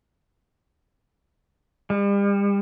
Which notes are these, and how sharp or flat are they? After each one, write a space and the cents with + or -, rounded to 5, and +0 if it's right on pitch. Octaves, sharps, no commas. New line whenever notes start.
G3 +40